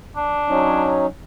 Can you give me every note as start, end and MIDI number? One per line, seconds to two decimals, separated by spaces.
0.16 0.97 62
0.49 1.06 54
0.49 1.06 61
0.49 1.06 63